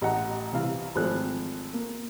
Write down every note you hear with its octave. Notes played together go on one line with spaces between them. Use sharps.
A1 D#5 F#5 A#5
C2 E3 F5
G#1 F3 A3 C5 F#6
A#3